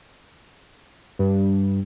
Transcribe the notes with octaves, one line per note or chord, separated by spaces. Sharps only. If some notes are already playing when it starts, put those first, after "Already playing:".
G2